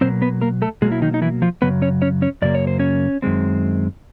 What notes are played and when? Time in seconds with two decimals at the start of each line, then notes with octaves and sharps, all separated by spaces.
0.01 B2 F#3 A#3 C4 C5
0.22 B3 B4
0.41 A#3 A#4
0.62 A3 A4
0.82 B2 F#3 G#3 A#3 G#4
0.92 E4
1.02 D#3 D#4
1.14 D#4
1.22 E3 E4
1.42 F3 F4
1.62 F#2 C#3 F#3 B3 B4
1.82 C#4 C#5
2.02 C#4 C#5
2.22 C#4 C#5
2.42 F#2 C#3 F#3 A#3 D5
2.55 C#5
2.67 C5
2.79 C#4 C#5
3.22 F#2 D#3 G#3 C4